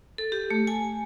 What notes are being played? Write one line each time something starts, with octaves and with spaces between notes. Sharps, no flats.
A4
G4
A3
G#5